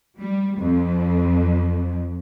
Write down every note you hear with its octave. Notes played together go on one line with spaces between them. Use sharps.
G3
F2